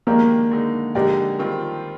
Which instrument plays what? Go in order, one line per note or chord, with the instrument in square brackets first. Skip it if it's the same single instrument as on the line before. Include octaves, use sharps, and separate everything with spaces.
[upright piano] D#3 G#3 D4 G4 [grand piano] A#3
[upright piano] D3 G#3 D#4
[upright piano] D3 G#3 D#4 A#4 D5 [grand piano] G4
[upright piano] D#3 G3 C4 F4